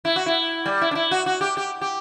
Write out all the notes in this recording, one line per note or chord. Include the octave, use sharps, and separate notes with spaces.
E4
F#4
E4
G3
E4
D4
E4
F#4
F#4
G4
G4
G4